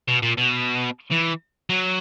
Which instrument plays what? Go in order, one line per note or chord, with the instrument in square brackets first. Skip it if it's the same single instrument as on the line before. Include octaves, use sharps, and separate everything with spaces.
[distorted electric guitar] B2
A#2
B2
E3
F#3